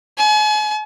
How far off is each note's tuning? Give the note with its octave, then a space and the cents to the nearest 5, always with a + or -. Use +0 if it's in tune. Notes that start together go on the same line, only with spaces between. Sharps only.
G#5 +40